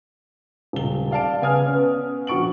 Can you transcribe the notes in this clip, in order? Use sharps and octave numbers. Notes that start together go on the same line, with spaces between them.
D#1 C#2 G7
D5 F5 A5 D7
C#3 B3 F5 G#5 D#6 F6
B3 C#4
A#1 F#4 C#6 D7 F#7